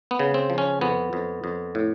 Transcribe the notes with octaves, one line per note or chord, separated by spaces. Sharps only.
B3
C#3
C4
F3
C#4
F2 B3
F2
F2
A2